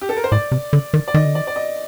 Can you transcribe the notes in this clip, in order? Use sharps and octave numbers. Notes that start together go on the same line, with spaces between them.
G4
A4
A#4
C5
A2 D5
C3
D3
D#3
D5
D#3 D#5
D3
D#3 D5
D5
D#5